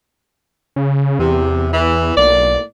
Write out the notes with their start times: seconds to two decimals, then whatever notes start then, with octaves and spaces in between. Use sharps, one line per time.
0.76 C#3
1.19 E2 C3
1.73 E3
2.17 B1 A2 A#3 D5